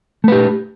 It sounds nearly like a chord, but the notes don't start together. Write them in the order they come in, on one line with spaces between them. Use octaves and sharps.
A3 B4 G4